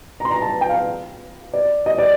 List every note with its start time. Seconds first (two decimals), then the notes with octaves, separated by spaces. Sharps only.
0.20 A#5
0.25 C6
0.31 A#5
0.42 A5
0.61 G5
0.69 F5
1.54 D5
1.86 D#5
1.98 D5